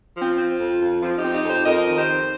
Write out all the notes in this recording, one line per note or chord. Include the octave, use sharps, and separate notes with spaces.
F3
C4 F4
C4
F2
F2
F3 C4 F4
D#4 G4
C4
D#4 G4
F2
G4 C5
F2 A#4 D#5
D#3
G4 C5
C4